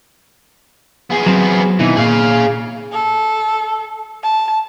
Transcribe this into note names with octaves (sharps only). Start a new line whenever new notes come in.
B3 G#4
F#3 C4
B2 D#3 E3 D#4
A#2 G#4 F5
A4
A5